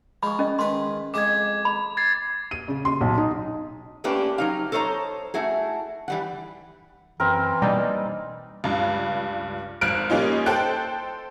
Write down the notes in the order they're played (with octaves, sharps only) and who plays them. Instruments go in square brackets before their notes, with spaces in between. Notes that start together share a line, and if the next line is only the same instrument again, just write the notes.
[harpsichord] F3 G#3 [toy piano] B5 C#6
[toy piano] C#4 D#5
[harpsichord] D#3 G#3 B4 [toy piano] C6
[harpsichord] F2 G#3 D#5 [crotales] D6 G#6
[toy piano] B5
[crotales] G#6 A6 C7
[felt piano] D#7
C#3
C6
B1
D#4
[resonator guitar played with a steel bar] A3 A#3 C#4 D4 G4 B4
F#3 D#4 F5
A4 C5 C#5 D#5 A#5
A3 E4 F#4 G#4
E3 G3 F#5
[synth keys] F#2 [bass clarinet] E3 [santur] C4 A#4
[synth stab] B2 G3 A#3 [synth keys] D4 D#4 D5
[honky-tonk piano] C#2 G2
G#1 F6 F#6 D7
G3 A#3 C#4 D#4 F4
A4 C5 G5 F#6